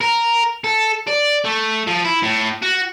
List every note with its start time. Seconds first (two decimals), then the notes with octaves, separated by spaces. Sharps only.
0.01 A#4
0.64 A4
1.07 D5
1.45 A3
1.87 F3
2.04 E4
2.23 A2
2.62 F#4